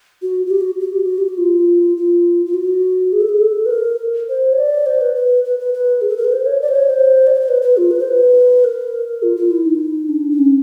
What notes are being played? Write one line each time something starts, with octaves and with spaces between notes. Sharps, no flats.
F#4
F#4
G4
F#4
F#4
G4
F#4
G4
F#4
F4
F4
F4
F#4
G#4
A4
G#4
A4
B4
A#4
C5
C#5
D5
C5
B4
B4
B4
B4
B4
G#4
A4
A#4
B4
C5
C#5
D5
C5
C#5
C5
D5
C#5
C5
B4
B4
F4
B4
C5
B4
A#4
F4
F4
E4
D#4
D4
D4
C#4